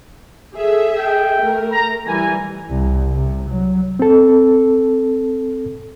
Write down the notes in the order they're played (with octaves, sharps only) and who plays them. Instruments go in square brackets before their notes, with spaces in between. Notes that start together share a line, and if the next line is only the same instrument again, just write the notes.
[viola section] G#4 A4 E5
[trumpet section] G5
[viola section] A3 A#4
[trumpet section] A#5
[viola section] E3 G3 [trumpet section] G#5
[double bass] C2
C3
F#3
[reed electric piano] C4 A4